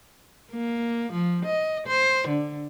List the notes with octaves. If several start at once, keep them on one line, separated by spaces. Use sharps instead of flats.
A#3
F3
D#5
C5
D3